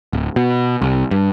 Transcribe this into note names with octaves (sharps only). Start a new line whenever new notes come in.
D1
B2
C2
G2